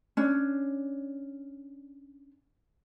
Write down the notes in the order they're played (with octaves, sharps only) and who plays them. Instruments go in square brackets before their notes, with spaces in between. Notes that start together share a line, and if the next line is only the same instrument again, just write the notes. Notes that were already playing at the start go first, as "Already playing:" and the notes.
[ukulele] C#4 D4